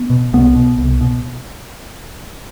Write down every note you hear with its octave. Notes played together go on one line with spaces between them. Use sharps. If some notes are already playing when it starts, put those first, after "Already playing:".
Already playing: B3
B2
C2 B3
B2
C2
B2